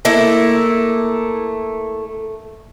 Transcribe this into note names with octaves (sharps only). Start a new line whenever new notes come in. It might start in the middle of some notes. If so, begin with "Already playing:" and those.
A3 A#3 E4